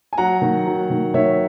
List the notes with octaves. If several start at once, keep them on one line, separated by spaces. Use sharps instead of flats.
G#5
F#3 F#5 A#5
D#3
F#3
D#3
D#3 C#5 E5